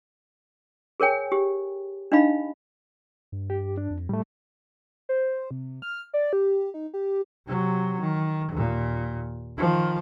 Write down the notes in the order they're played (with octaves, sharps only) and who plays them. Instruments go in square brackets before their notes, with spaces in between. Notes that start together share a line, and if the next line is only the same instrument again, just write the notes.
[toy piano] G#4 A#4 C#5 G5 G#5
G4
D4 D#4 D#5 F5 B5
[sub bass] G2
[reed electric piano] G4
D4
[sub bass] F2
[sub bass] A2 [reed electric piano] G3 A3
[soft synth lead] C5
C3
F6
D5
G4
D#4
G4
[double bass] C3 F#3
D#3
D#2 A#2
D#3 F3